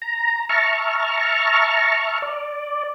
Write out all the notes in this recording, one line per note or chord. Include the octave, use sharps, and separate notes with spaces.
A#5
E5 A5 A#5 C#6 F6
D5